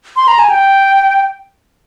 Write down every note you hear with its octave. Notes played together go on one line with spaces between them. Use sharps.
C6
A#5
G#5
G5